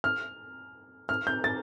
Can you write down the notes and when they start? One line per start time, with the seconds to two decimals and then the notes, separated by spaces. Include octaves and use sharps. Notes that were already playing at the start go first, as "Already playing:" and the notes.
0.04 F6
1.09 F6
1.27 G6
1.44 A6